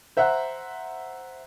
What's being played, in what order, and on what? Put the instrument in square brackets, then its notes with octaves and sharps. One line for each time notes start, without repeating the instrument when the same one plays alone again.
[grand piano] C5 E5 F#5 A#5 F#6